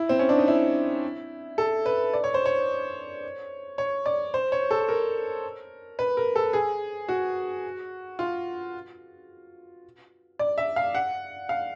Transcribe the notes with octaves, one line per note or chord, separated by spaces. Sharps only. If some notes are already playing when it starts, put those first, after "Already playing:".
Already playing: E4
C4
C#4
D4
D#4
E4
A4
B4
D5
C#5
C5
C#5
C#5
D5
C5
C#5
A4
A#4
B4
A#4
A4
G#4
F#4
F4
D5
E5
F5
F#5
F5